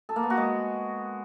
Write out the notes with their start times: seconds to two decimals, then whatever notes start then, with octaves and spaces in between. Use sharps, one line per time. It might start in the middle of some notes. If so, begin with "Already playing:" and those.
0.09 A4
0.16 A#3
0.23 B3
0.30 F#4
0.37 G#3